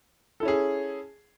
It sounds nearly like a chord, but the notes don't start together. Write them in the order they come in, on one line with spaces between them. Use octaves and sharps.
A4 E4 C#4 G#4